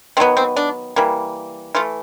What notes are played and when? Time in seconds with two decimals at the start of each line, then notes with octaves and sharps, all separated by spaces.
0.17 D#3 F#3 B3 C4
0.37 C4
0.56 D4
0.96 E3 G3 A#3
1.75 E3 A3 F4